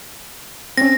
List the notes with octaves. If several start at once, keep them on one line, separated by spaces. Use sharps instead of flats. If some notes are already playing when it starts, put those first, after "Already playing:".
C4 C#4 A#6